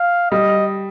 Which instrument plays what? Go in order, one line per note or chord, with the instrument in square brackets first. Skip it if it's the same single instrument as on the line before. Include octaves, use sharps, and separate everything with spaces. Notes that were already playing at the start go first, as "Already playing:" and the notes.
Already playing: [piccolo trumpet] F5
[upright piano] G3 [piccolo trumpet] D#5